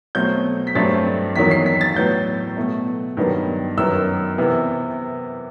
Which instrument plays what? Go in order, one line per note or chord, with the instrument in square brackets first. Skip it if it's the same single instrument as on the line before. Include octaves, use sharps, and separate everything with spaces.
[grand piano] B2 F#3 A3 C4 G6
B6
G2 F#3 A3 C4 A6
E2 D#3 F#3 B6
C7
B6
A6
A2 F#3 B3 G6
B2 F#3 A3
G2 D#3 F#3 B3
F#2 D#3 F#3 B3 E6
C3 E3 B3